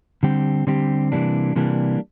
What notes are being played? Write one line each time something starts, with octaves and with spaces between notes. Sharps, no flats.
D3 G3 C4 G4
D3 G3 C4 G4
C3 E3 G3 A#3 D4
C3 E3 G3 A#3 D4